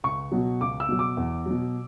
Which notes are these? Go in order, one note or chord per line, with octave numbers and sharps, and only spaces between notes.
C#2 C#6
B2 F#3
C#2 D6
E6
B2 F#3
D6
E2
B2 F#3